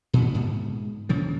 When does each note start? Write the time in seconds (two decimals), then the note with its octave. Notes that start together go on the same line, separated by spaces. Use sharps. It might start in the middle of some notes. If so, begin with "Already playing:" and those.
0.13 A#2 B3
0.34 G#2
1.09 D#1 C#3 F3